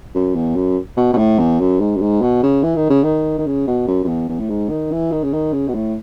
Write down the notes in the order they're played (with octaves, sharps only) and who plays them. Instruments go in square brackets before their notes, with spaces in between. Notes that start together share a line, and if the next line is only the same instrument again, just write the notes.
[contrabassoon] F#2
E2
F#2
B2
B2
A2
E2
F#2
G#2
F#2
G#2
B2
C#3
E3
D#3
C#3
D#3
D#3
C#3
B2
F#2
F#2
E2
E2
A2
G#2
D#3
E3
D#3
C#3
D#3
C#3
B2
A2